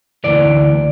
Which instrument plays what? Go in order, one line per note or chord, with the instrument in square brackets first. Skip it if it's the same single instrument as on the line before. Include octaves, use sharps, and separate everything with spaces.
[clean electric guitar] D2 C#3 E3 D5